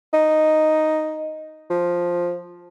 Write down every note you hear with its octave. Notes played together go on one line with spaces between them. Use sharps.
D#4
F3